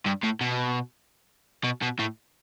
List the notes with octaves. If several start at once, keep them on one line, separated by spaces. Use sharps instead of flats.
G2
A2
B2
B2
B2
A2